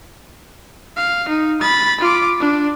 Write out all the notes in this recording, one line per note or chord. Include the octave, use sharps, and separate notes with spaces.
F5
D#4
B5 A6
F4 D6
D4